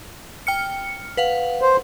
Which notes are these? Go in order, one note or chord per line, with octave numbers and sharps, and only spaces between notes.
G5 F6 C#7
B4 F5 F#5
C5